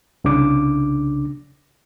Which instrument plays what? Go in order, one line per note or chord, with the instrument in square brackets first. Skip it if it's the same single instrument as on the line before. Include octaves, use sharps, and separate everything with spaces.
[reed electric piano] C2 C#3 D4 D6